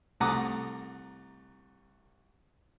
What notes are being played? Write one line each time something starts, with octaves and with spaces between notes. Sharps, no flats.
C2 A3 F#5 A#5 D6 D#6